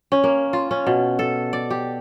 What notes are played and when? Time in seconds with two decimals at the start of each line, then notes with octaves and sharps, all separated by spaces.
0.12 C#4
0.24 A#3
0.53 F4
0.71 C#4
0.87 B2
1.19 A4
1.53 D5
1.71 G4